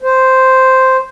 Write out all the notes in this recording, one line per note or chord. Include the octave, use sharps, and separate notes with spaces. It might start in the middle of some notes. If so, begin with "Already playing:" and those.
C5